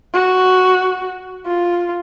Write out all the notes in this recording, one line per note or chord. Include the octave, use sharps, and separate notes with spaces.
F#4
F4